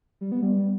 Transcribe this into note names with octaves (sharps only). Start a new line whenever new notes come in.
G3
B3
G3